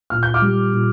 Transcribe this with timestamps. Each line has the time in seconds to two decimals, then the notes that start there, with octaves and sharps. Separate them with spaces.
0.10 A#2 F6
0.23 G6
0.34 D6 F6
0.42 G3
0.73 A#2